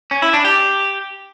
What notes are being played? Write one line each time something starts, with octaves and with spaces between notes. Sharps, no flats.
C#4
E4
D4
G4